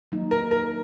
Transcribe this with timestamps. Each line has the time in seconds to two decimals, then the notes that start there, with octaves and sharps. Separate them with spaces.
0.12 F#3 A#3 D#4
0.31 A#4
0.51 A#4